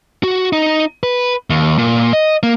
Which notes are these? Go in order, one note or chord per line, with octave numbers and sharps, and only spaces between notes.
F#4
D#4
B4
D#2
A#2
D#5
A#3